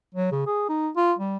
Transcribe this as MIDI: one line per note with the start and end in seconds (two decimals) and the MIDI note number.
0.14 0.31 54
0.31 0.45 49
0.46 0.65 68
0.69 0.89 63
0.96 1.14 65
1.19 1.37 55